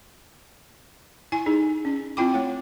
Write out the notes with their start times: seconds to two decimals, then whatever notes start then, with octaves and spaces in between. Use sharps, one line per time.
1.32 E4 G#5 C#6
1.46 D#4 G#4
1.85 C#4
2.17 C4 E4 F4 G5 B5 D6
2.33 A3 C#5 F#5